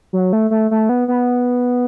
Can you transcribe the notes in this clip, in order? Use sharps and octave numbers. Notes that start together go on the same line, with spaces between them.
F#3
A3
A3
A3
B3
B3